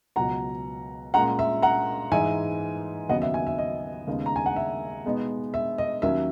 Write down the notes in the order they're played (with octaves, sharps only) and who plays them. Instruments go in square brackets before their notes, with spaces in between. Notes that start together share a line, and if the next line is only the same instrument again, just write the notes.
[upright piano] C#2 B2 F#3 F#5 A#5
A#2 G#3 C#4 F#5 A#5
E5
F#5 A#5
G#2 E3 G#3 D#4 E5 G#5
D#2 C#3 F#3 B3 D#4 D#5 F#5
E5
E5 G#5
E5
D#5
D#2 C#3 G#3 B3 D#4
A#5
G#5
F#5
E5
B2 G#3 B3 D#4
E5
D#5
D#2 D#3 F#3 C#4 E5